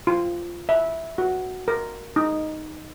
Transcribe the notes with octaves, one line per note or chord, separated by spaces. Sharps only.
F4
E5
F#4
A#4
D#4